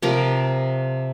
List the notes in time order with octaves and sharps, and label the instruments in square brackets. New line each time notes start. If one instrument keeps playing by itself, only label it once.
[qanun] C3 F3 A#4 D6